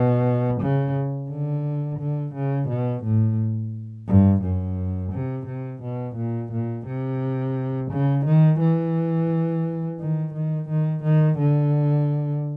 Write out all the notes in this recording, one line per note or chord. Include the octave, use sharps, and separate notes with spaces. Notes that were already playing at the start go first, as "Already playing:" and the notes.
Already playing: B2
C#3
D3
D3
C#3
B2
A2
G2
F#2
C3
C3
B2
A#2
A#2
C3
C#3
D#3
E3
D#3
D#3
D#3
D#3
D3